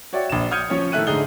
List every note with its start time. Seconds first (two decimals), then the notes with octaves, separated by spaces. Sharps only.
0.13 F#4 C#5 D5 E5 G5
0.29 A#1 E7
0.51 D#6 F6 G6 G#6 C#7 D#7
0.70 F3 C#4 C#5
0.92 A2 D#3 A3 E5 F#6 D#7
1.07 G#2 D3 D#4 G#4 G7